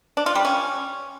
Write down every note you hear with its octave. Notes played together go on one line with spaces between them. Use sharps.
D4
F4
G3
C#4